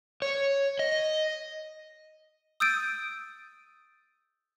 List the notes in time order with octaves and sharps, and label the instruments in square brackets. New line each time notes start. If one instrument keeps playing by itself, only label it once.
[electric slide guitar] C#5
D#5
[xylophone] D#6 E6 G6 A6 D7 D#7